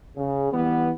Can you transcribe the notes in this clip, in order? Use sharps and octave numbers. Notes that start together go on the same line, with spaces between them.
C#3
E3 G3 B3